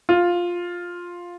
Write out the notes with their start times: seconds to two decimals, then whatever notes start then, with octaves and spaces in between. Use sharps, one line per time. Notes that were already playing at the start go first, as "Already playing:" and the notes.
0.09 F4